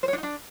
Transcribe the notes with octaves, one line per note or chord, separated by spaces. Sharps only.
C5
C#5
D4
D#4
D4